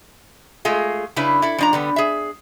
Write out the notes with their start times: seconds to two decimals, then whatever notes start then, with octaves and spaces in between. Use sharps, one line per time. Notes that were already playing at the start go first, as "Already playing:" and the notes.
0.65 G#3 A3 F4 G#4
1.16 C#3 C#4 D4 E4 B4
1.42 E4 A4
1.58 F3 D4 A#5
1.73 D3 G3 B3
1.96 G#4 E5